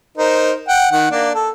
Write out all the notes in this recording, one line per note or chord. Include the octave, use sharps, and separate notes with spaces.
D#4 A#4 C5
F#5 G5
D#3 F#5
A#3 D4
A4